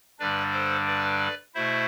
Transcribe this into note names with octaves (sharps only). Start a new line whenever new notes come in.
G2 D3 G3 D4 B4 D5
A4 C5
B4 D5
B2 A3 E4 C5 E5